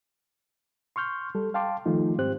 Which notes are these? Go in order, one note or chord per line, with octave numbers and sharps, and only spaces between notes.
C6 C#6 F6 G6
G3 A4
F5 G5 A5 C6 D6
D#3 F3 G3 A3 D#4 F4
G#2 C4 G4 C5 F#6